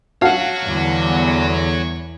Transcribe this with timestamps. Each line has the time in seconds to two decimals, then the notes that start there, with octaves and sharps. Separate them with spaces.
0.22 F#4 C#5 F5 F#5 A5
0.64 E2 D3 G3